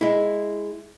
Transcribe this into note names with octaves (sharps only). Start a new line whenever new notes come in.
G#3 E4